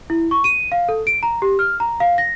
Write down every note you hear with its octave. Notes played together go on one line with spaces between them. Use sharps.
E4
C#6
D#7
F5
A4
D7
A#5
G4
F6
A#5
F5
A#6